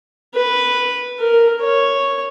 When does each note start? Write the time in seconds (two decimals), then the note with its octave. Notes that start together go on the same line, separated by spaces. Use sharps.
0.35 B4
1.19 A#4
1.61 C#5